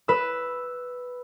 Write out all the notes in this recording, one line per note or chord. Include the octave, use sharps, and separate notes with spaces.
B4 E6